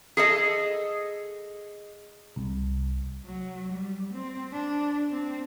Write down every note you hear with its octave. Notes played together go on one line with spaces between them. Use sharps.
G#4 A4 D#5
C2
F#3
G3
C4
D4
C4